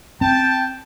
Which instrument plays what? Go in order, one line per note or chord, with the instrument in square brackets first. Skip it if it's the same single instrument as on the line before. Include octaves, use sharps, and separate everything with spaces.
[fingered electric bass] C4 [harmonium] G5 [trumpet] A5